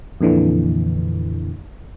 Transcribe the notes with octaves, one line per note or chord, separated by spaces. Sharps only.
F2 A#2 D3 E3